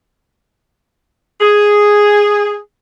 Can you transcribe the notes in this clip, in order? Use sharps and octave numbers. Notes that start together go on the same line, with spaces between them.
G#4